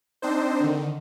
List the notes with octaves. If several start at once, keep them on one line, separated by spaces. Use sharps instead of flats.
C4 D4 D#4 C5
D3 D#3